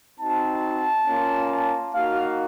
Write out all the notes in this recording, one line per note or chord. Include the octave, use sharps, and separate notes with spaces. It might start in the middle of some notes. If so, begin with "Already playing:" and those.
C4 D#4 F#4 A5
A#3 C#4 F4
A#3 D#4 F#4 F5